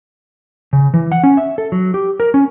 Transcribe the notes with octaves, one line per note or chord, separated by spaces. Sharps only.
C#3
E3
F#5
C#4
E5
A4
F#3
G4
A#4
C#4